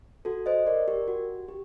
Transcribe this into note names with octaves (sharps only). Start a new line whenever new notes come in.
F#4 A4
C5 D#5
A#4 D5
G4 A#4
F#4
G4